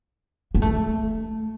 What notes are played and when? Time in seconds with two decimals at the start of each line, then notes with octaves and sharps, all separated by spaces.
0.55 A#3
0.62 A3